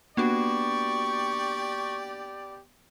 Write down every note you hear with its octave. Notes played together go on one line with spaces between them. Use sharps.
A#3 B3 D4 F#4 G4 D5 C#6